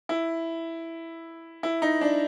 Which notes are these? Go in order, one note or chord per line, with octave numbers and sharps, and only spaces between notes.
E4
E4
D#4
D4